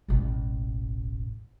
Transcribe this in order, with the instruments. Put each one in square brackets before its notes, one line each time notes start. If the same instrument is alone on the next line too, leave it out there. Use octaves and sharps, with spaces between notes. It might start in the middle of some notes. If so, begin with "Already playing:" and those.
[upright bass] E1 A1